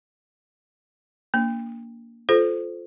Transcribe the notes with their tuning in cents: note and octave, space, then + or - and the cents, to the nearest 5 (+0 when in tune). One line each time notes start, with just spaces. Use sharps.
A#3 +0 D4 -30
F4 +0 A4 -20 C5 -15